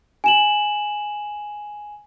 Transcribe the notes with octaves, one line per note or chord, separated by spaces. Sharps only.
G#5 E7 F#7